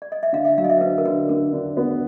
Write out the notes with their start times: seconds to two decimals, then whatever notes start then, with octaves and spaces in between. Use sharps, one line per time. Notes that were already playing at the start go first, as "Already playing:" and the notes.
0.02 D5
0.12 D#5
0.23 E5
0.33 D3 F5
0.45 E5
0.57 F#3 F5
0.64 D#5
0.70 E5
0.77 C5
0.81 D3 B4
0.98 A#4
1.05 D3 B4
1.29 D3 A#4
1.53 D3
1.77 B3